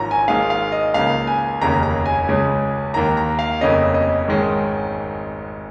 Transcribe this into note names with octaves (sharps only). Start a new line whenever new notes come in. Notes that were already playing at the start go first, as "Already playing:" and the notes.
Already playing: G#1 G#2 F3 C#4 A#5
G#5
G#1 G#2 G#3 F5
F5
D#5
C#2 C#3 A#3 F5
G#5
F1 D#2 C#3 A#3 C#4 A#5
A#5
G#5
C#2 C#3 G#3 C#4
D#2 D#3 A#3 A#5
A#5
F5
F1 F2 C#3 A#3 C#4 D#5
D#5
G#1 G#2 D#3 G#3 C#4